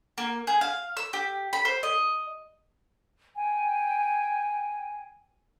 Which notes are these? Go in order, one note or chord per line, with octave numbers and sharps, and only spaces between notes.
A#3
G#4
F5
E6
G4
B5
C5
D#5
G5 G#5